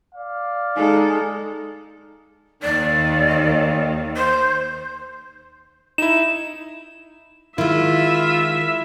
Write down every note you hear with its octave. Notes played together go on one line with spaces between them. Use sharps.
D5 F5
G#3 D#4 A4
D#2 D#3 D5
C5
D#4 E4 E7
D#3 G#3 E4 F4 E5